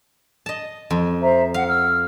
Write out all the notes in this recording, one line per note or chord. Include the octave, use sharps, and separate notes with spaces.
D#5 A5
F2
C5 E5 A#5
F5 F#5
E6 F6